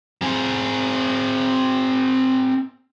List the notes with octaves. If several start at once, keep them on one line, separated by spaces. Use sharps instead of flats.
C4 G#4